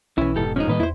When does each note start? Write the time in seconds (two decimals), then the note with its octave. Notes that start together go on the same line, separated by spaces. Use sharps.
0.18 B1 E3 C#4 E4
0.36 F1 G#2 B2 G4 A4
0.56 F3 G#3 C#4 D#4
0.68 A2 D#3 G3 A#3 B4 D#5
0.80 E2 E4 C5